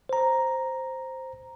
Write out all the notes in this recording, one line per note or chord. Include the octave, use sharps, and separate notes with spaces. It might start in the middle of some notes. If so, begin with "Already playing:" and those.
C5 A#5